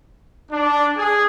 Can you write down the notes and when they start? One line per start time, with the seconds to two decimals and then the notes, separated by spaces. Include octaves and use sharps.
0.52 D4
0.96 G#4